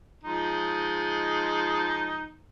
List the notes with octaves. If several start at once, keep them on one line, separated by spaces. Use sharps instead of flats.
F3 G#3 D#4